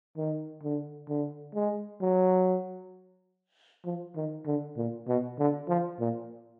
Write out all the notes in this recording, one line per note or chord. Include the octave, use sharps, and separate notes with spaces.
D#3
D3
D3
G#3
F#3
F3
D#3
D3
A#2
B2
D3
F3
A#2